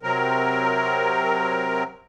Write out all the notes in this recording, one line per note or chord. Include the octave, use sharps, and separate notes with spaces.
C3 F#3 C4 A#4